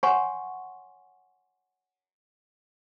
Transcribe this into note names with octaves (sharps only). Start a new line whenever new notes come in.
C#5 F#5 G#5 C6 C#6